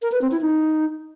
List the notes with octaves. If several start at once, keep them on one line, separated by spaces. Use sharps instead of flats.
A#4
B4
C4
E4
D#4